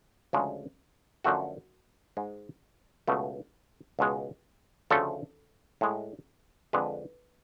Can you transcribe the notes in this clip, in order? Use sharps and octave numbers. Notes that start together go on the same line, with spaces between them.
D2 C#3 F3 G#3
F#2 D3 F3 A3 F#4
G#2 G#3
C#2 B2 A3
C#2 B2 G#3
D2 C#3 F3 A3 A4
A2 G#3
F2 D3 G#3 B4